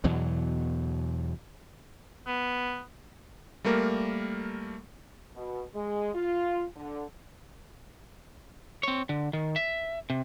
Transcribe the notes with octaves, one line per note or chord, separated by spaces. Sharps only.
E2 B2 E3 F#3
B3
G3 A3 A#3 A#4
B2
G#3
F4
D3
C4 C#5
D3
D#3
E5
C3